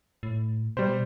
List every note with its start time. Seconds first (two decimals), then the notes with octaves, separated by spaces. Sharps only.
0.23 A2
0.77 B2 G3 C5